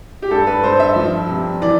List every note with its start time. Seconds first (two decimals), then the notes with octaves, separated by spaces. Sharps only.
0.22 G4
0.31 G2 A4
0.47 B4
0.63 G2 C5
0.80 E5
0.96 F3
1.29 C3
1.62 E3 D5